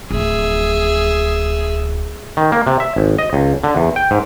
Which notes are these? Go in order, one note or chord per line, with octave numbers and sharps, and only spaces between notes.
D1 F3 G#4 E5
D#3
A#3
C3
E5
G#1
D#5
C#2
D3
E2
G5
G#2